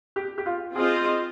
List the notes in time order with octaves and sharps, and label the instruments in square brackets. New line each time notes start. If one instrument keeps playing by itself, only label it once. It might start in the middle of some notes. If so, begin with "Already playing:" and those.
[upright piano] G4
G4
F4
[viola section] C4 F4 C5 D#5 [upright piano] G#4